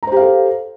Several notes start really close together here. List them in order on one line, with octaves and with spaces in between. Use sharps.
A#5 C5 G4 F5 A4